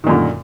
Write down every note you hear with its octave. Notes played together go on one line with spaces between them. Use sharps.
F#2 A#2 D3 D#3